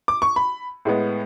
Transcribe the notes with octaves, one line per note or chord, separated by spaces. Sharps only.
D6
C#6
B5
A2 G#3 B3